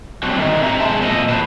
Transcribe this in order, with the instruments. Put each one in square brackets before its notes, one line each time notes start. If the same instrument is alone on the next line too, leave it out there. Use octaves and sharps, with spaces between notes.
[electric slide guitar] F#3 G3 A3 C4 D4 F#4
D3 D#3 F#3 A3 C4 D#4
C4 E5 A#5
F#2 B2 G#3 C5 A5
F2 A#2 A4 D#5
E2 A2 B4 C5 A5